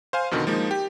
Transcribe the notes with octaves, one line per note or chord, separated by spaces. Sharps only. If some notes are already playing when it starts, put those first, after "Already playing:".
C5 F5 G#5
F2 B2 D3 D#3
F3 G#3 A#3 D#4
G4